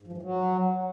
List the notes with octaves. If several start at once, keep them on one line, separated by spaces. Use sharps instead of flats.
G#2
F3
G#2
E3
F#3